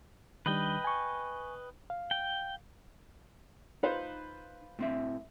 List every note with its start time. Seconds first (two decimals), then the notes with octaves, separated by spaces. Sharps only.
0.46 D#3 G3 D4 B4 D#5 G5
0.84 G#5 C#6
1.90 F5
2.11 G5
3.83 D#4 F4 B4 C5
4.79 A2 C4 E5